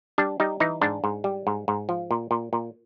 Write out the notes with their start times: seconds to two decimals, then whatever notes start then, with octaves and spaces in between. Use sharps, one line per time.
0.18 G3 D4
0.40 G3 D#4
0.60 E3 D#4
0.81 G#2 D4
1.04 G#2
1.24 G3
1.47 G#2
1.68 G#2
1.89 F3
2.11 A#2
2.31 A#2
2.53 A#2